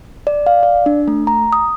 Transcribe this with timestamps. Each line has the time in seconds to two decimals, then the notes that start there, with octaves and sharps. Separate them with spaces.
0.27 D5
0.46 F5
0.63 D5
0.86 D4
1.08 A3
1.27 A#5
1.53 D#6